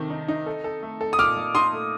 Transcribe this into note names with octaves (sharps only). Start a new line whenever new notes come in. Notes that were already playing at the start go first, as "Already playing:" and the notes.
Already playing: C3 D#3 A3
D#4
D#4
A4
A4
A3
A4
D#6
A#2 D6 F6
A#2
D#4 C6 D#6
A3